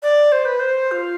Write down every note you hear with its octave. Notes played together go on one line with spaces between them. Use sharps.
D5
C5
B4
C5
F4